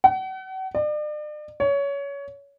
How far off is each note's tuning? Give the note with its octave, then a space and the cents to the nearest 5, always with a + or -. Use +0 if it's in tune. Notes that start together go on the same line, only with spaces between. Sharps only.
F#5 +40
D5 +40
C#5 +20